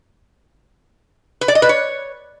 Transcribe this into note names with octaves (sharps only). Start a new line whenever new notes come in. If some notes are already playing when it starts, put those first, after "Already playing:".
B4
D5
D#5
B4
C#5